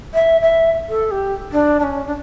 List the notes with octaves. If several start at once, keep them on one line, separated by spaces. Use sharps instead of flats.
E5
E5
A4
G4
D4
D4
C#4
D4